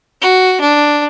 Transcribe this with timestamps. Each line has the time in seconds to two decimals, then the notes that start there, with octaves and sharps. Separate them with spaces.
0.21 F#4
0.60 D4